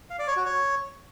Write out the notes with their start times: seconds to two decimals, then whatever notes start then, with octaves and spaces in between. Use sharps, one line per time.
0.10 F5
0.19 D5
0.28 C#5
0.36 F#4
0.45 C#5